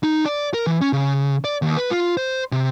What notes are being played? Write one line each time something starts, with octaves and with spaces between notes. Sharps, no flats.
D#4
D5
A#4
E3
C#4
C#3
D5
D#2
B4
F4
C5
C3